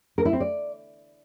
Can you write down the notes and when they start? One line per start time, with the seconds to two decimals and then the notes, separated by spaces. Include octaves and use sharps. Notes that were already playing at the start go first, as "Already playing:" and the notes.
0.18 A#4
0.25 E4
0.33 C4
0.40 D5